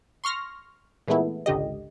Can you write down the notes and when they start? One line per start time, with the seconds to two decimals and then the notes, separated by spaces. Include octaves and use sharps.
0.24 C6 C#6 F6 A#6
1.08 A#2 E3 G#3 A3 B3 E4
1.46 G#1 C#2 D3 G4 D#5